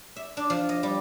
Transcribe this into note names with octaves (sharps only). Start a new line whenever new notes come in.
E5
D4
F3
D#5
G3